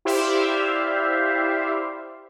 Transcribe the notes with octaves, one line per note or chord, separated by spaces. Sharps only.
E4 G4 C5 D5 E5 F5